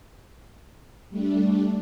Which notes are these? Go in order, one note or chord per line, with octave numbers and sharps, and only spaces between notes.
G3 A3 D4